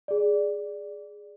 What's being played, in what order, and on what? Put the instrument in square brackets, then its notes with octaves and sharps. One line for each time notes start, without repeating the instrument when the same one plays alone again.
[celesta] G#4 D5